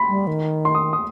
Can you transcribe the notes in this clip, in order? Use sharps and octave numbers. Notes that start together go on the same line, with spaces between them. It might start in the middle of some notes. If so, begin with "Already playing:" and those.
Already playing: B5 C6
G3
D#3
C6
D#6
D#6